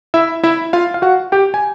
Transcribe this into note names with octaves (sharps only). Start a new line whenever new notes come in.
E4 E5
E4 E5
F4 F5
F5
F#4 F#5
G4 G5
G#5